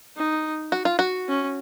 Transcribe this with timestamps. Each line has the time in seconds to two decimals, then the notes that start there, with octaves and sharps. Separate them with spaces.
0.17 D#4
0.72 F#4
0.85 F4
0.99 F#4
1.29 C#4